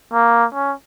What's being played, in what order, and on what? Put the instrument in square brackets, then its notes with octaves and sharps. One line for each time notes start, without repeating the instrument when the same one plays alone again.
[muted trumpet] A#3
C#4